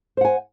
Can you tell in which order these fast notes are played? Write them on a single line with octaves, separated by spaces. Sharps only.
C5 F#5 G#5